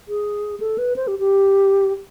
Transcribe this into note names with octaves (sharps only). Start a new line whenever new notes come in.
G#4
A4
B4
C5
G4
G4